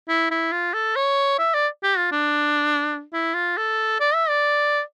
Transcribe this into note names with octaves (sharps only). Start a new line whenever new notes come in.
E4
E4
F4
A4
C#5
E5
D5
G4
F4
D4
E4
F4
A4
D5
E5
D5